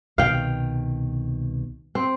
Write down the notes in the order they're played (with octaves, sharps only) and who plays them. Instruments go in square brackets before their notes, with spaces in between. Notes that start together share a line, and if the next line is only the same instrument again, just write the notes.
[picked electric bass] C2 B2 D#3 [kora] F5 G5
[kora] C4